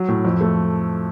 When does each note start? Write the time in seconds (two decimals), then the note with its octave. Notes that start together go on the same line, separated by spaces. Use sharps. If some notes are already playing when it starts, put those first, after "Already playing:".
Already playing: F#3
0.08 A2
0.25 F2
0.41 A3